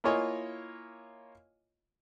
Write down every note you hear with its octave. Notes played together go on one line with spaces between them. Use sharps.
A#3 E4 F4 C#5 D#5 G#5